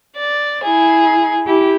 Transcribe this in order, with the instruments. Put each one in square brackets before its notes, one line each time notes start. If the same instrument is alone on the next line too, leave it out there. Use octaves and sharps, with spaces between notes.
[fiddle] D5
[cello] E4 [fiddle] G#4
[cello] E4 G4